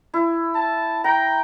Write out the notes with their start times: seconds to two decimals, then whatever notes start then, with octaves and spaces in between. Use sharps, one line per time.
0.14 E4
0.55 A5
1.04 G5 A#5